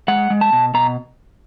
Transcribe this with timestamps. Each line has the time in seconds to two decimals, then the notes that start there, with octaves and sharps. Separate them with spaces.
0.08 G#3 F#5
0.30 G#3
0.41 A5
0.52 B2
0.74 B2 A#5